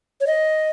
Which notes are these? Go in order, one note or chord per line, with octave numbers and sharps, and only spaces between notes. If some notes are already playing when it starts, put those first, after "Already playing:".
C#5
D#5